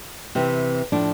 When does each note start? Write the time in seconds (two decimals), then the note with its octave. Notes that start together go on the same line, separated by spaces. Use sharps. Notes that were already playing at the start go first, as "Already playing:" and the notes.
0.35 C3 E3
0.92 A2 F3 D4